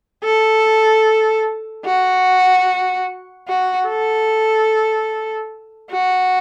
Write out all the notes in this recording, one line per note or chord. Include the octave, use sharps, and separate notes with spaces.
A4
F#4
F#4
A4
F#4